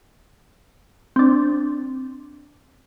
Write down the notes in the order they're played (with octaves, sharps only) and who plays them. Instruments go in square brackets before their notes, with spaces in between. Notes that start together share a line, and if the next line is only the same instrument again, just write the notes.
[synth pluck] C4 D4